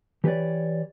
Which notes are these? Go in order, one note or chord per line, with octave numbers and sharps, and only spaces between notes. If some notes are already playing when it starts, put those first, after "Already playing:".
E3 G4 B4 C#5 D5